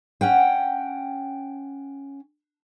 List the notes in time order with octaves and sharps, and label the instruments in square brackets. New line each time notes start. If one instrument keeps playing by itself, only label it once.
[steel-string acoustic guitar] C#4 F#5 G5